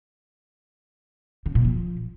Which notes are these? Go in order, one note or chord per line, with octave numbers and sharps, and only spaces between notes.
C#3
A#2
F3